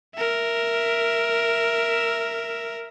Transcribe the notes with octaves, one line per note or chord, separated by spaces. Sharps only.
A#4 E5